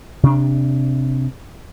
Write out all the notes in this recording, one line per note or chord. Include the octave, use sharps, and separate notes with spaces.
C3 D4